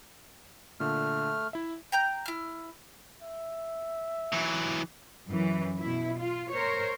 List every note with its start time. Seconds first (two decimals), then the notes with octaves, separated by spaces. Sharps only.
0.80 A#2 D3 A3 F6
1.53 E4 E5
1.92 G5 A#5 G6
2.26 E4 F6
3.23 E5
4.32 E3 F#3
5.27 F#2 E3
5.79 B2 E4
6.20 F4
6.51 A#4 C5 C#5